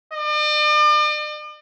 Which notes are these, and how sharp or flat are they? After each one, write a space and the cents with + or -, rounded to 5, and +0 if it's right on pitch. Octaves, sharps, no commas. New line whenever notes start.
D5 +45